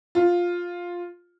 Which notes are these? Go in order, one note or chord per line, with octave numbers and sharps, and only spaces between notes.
F4